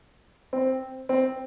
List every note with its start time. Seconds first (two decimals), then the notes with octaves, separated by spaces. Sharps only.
0.53 C4
1.09 C4